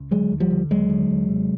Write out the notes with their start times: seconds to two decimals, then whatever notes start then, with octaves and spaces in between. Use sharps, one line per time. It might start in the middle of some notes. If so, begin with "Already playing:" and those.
Already playing: C#2
0.11 D3 F#3 G#3
0.32 D#2
0.40 F3 G3
0.51 D3
0.70 D#2 F#3 G#3
0.90 D3
1.10 D#2
1.29 C3